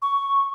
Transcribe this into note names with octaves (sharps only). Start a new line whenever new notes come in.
C#6